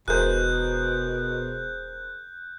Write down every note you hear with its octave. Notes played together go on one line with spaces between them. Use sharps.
E1 B2 G#4 A#4 C5 F#6 G6